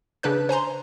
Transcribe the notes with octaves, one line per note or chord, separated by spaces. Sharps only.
C#3 D4 B4 F#6
C5 G#5 A#5 C6